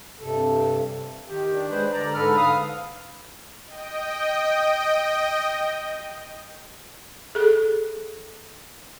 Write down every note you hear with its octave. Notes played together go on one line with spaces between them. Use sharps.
G2 C3 A4
D#3 G4
D4
G#3 B4 C5
D3 D5 A#5
G#2 A4 B4 F6
F5 D#6 F6
D#5 G5
G#4 A4